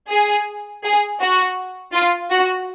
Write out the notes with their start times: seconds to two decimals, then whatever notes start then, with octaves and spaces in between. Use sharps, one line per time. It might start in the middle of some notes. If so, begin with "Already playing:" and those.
0.10 G#4
0.84 G#4
1.21 F#4
1.94 F4
2.31 F#4